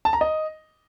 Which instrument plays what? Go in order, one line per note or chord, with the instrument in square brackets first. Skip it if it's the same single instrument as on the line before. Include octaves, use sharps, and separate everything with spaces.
[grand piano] A5
A#5
D#5